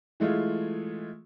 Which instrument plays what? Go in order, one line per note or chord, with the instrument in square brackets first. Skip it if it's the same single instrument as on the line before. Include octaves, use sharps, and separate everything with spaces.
[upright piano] E3 G#3 A3 F4